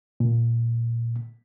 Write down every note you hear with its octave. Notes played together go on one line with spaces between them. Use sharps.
A#2